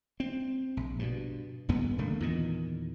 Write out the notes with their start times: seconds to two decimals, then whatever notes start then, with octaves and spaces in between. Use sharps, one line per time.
0.20 C4
0.77 A#1
0.99 G2 B2
1.69 D#1 D2 G2 B3
1.98 E1 D3 A3 A#3
2.20 E2 A#2 D#3